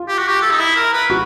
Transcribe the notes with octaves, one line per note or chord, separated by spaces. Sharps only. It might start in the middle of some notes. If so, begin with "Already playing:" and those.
Already playing: F4
G4
F#4
G4
A4
D#4
E4
A#4
B4
F#4